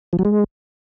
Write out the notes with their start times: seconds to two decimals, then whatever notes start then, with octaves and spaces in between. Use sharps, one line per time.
0.13 F3
0.19 F#3
0.25 G#3